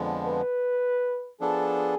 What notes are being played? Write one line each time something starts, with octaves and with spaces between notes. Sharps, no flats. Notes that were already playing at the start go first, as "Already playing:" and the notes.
Already playing: F2 D3 F3 G#3 B3
B4
F3 B3 D4 G#4 A4